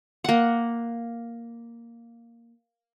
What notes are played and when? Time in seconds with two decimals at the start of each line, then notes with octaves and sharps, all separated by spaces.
0.24 A#3 F#5